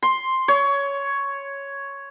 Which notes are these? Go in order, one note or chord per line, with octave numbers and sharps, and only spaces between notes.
C6
C#5